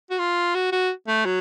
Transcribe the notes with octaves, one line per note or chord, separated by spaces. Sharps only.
F#4
F4
F#4
F#4
A3
F#3